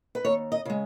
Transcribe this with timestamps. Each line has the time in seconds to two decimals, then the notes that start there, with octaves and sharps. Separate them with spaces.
0.15 B4
0.25 D#2 C#5
0.52 D#5
0.65 C#3 G#3